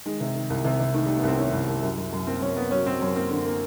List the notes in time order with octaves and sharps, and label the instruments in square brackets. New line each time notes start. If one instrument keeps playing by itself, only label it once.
[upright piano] D#3 [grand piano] G#3
[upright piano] C3
D#3
C2
C3
C3
[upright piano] D#3 [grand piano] A3
[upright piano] D#3 [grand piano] G3
[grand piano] B3
[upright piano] C2 [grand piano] C4
[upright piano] D#3 [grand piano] C#4
[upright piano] C2
C2
F#2
F#2
F#2
[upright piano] A#3 [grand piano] C4
[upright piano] F#2 [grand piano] C#4
[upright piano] A#3 [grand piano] B3
[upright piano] F#3 [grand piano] C#4
[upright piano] F#3 [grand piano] C4
[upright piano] F#2 [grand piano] C#4
[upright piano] A#3 [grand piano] C4
[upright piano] D3
A#3